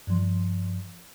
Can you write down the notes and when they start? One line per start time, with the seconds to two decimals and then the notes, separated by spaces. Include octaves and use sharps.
0.07 G2 F3